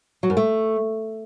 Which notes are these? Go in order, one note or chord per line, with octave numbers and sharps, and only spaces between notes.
F#3
F#2
A3